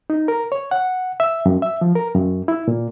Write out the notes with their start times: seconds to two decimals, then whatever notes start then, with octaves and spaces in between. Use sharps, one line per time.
0.10 D#4
0.28 A#4
0.52 C#5
0.71 F#5
1.20 E5
1.46 F#2
1.62 E5
1.81 F3
1.95 A#4
2.15 F#2
2.48 E4
2.68 A#2